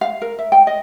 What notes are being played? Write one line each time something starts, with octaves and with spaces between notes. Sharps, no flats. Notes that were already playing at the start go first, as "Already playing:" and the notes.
F5
A#4
E5
G5
D#5